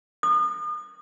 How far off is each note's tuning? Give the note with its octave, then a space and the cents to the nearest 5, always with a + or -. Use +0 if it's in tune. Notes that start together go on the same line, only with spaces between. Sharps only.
D#6 -40